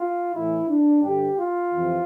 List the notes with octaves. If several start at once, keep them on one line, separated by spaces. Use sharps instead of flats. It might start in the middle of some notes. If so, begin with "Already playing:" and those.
Already playing: F4
A2 E3 E4
D4
G2 D3 G4
F4
F2 C3 E3